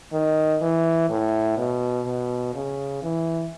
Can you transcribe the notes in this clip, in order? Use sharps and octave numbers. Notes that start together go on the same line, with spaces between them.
D#3
E3
A2
B2
B2
C#3
E3